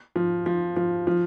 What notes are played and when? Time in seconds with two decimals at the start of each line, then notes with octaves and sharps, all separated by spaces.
0.16 F3
0.46 F3
0.76 F3
1.07 F3